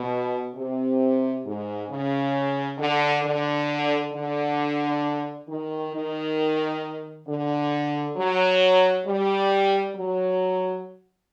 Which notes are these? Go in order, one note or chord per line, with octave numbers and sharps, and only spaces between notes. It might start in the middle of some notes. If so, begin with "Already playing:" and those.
Already playing: B2
C3
G#2
C#3
D3
D3
D3
D#3
D#3
D3
F#3
G3
F#3